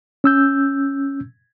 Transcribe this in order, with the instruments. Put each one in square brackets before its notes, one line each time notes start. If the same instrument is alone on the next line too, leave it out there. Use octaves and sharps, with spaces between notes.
[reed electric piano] C#4 E6 G6